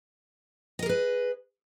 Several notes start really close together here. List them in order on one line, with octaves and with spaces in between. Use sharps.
D#5 A#4 G#4 B4